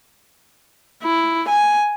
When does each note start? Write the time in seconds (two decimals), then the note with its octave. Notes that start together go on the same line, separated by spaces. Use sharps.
1.03 E4
1.48 G#5